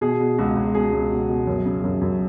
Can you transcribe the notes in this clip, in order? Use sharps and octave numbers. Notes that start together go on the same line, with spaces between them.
B2 G#4
B2
C#2 F#4
C#2
B2 G#4
C#2
B2
B2
F#2
C#3
F#2
F#2